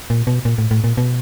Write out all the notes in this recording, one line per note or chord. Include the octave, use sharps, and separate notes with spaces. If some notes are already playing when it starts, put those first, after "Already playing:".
A#2
B2
A#2
A2
A2
A#2
B2